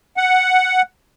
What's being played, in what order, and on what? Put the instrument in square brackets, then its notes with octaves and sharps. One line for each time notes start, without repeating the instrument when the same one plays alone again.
[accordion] F#5